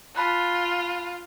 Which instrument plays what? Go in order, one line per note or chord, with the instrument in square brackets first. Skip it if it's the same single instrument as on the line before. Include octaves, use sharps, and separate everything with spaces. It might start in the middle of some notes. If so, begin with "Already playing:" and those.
[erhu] F4 [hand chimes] A5 B5 F#6